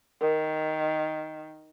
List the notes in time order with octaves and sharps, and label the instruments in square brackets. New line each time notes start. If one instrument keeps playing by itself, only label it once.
[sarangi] D#3 [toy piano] A#4